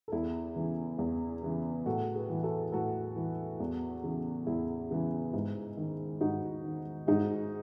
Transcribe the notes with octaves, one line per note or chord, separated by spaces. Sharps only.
A4
E2 E4 G#4
C#3 E3
E2
C#3 E3
A2 F#4 A4
G#4 B4
E3
F#4 A4
A2 F#4 A4
E3
E2
C#3 E3
E2 E4 G#4
C#3 E3
G#2
D#3
G#2 D#4 F#4
D#3
G#2 D#4 F#4